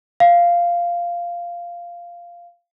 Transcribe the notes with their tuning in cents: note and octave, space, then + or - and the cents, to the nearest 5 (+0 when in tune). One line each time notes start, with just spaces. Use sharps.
F5 -10